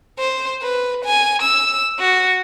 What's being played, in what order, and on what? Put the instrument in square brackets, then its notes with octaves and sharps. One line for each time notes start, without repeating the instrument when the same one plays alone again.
[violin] C5
B4
G#5
E6
F#4